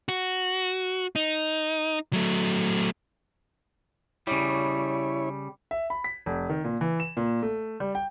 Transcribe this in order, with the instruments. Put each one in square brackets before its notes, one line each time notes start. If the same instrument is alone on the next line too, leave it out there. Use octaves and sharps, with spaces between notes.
[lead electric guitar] F#4
D#4
F#3 A3
[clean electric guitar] C#3 G3 [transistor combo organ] E4 C#5
[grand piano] E5
B5
B6
F1
D#3
A#2
E3
E7
A#2
A3
G3
G5